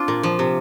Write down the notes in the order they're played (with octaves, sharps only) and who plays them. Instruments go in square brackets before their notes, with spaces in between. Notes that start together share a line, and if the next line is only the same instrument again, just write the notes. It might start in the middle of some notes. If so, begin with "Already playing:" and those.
Already playing: [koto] C4 D4 F4
A#2
F3
C3